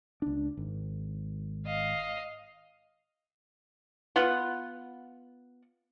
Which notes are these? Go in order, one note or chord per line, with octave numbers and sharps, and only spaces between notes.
C#2 D4
G#1
D#5 F5
B3 F4 F#5